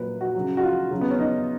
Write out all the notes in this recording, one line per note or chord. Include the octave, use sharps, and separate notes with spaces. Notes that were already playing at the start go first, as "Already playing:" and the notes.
Already playing: A#2 F#3 B4
F#4
C#3 F#3
F#4
F4
C#3 F#3
B3
C#4
D#4